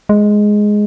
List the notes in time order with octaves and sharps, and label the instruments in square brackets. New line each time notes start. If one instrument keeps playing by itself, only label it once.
[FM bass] G#3